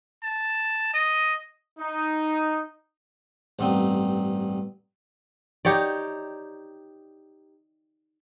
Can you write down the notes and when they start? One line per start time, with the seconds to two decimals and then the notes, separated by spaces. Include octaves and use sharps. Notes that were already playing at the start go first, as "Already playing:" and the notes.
0.23 A5
0.94 D#5
1.79 D#4
3.59 A1 G2 B3 C4 D#4
5.65 D#4 G4 C#5 D5